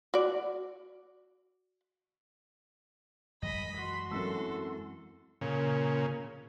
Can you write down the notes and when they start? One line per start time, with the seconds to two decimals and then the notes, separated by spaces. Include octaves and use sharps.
0.14 F#4 D5
3.42 F#2 E3 G#3 D#5 B5
3.77 F#4 C6
4.11 F#2 E3 G#3 A#3 C4 A4 E6
5.41 A#2 C#3